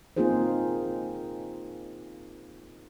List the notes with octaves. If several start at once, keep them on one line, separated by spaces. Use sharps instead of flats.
A#3 C4 D#4 F4 G#4 C5